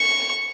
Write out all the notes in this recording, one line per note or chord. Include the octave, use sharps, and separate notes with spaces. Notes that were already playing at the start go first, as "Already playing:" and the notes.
Already playing: C#6